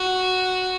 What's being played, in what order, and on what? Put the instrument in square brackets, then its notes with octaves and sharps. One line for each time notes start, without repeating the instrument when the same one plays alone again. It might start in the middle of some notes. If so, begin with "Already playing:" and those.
Already playing: [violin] F#4